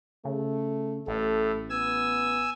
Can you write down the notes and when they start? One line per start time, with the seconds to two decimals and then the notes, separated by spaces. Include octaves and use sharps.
0.25 C#3 A3
1.07 A1 A2 A4
1.70 B3 G#5 E6